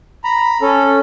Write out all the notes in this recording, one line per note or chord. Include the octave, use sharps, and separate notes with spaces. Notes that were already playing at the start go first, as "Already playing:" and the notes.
A#5 B5
C#4 A4